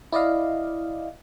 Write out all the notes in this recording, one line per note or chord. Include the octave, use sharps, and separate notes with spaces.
E4 D5 D#5 F5